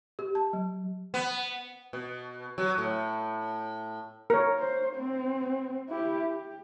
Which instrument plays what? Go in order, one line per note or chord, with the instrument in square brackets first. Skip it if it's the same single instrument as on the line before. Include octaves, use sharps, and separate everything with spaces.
[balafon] G4
A5
F#3
[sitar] B3
B2
F#3
A2
[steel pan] A#4 C#5
[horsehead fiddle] C5
C4
E4 G4
G4